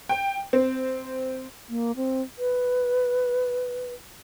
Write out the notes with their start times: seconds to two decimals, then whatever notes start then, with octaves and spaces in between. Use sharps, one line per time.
0.09 G5
0.53 C4
1.69 A#3
1.96 C4
2.39 B4